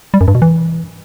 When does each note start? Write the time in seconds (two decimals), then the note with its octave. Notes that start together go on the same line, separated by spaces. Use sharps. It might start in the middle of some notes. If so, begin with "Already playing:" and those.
0.14 G3
0.21 F#2
0.28 G2
0.35 B2
0.42 E3